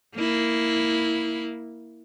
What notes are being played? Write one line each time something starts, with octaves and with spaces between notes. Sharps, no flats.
A#3 E4